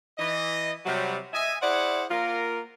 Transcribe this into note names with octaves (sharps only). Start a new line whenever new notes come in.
E3 D#5
C3 F#3 G3
D#5 E5 G#5
E4 G#4 C5 D5 F#5
A#3 F4 A#4